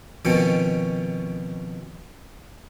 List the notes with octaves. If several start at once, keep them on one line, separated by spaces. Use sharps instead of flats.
B2 D#3 F3 C4 C#4